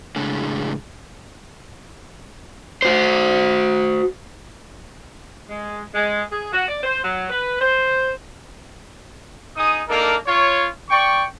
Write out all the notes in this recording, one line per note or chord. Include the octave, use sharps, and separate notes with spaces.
A2 C#3 G#3 D4
F#4 C5
G#3
G#3
G#4
F#4
D5
C5
F#3
B4
C5
D#4 G#4 D#6
A#3 D4 D#4 A4 A#4
F4 C#5
D5 G5 C#6